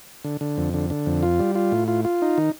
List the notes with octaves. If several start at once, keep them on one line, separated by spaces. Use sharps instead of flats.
D3
D3
F2
D3
D3
F2
F4
G3
F4
A2
F4
F4
D#4
D#3